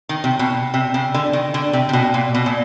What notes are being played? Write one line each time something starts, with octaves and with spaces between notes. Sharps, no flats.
D#3
C3
B2
C3
C#3
D3
D#3
D3
C3
C3
B2
A#2
B2
A#2